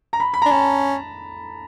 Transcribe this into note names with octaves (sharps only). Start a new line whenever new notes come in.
A#5
B5
B5
A#5
D4
C#4 A5